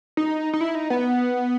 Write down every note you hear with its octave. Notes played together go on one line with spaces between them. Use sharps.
D#4
D#4
E4
D#4
B3